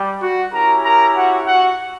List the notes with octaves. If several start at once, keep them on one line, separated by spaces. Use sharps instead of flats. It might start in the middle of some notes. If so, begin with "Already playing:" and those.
Already playing: G3
F#4 F#5
C#4 E4 G4 A#4 A#5
A#4 A#5
F#4 F#5
F#4 F#5